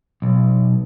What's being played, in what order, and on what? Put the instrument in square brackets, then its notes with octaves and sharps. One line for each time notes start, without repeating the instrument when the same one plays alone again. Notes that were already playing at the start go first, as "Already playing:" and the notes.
[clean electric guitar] B1